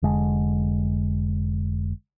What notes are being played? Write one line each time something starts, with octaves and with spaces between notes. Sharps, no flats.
F1 D3 G#3